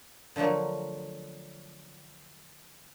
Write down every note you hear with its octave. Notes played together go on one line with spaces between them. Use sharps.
D3 F3 F#3 A3 A#3